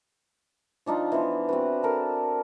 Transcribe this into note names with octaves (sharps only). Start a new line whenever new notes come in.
F3 D4 D#4 F4
E3 B3 C5
C4 F#4 B4
A4 A#4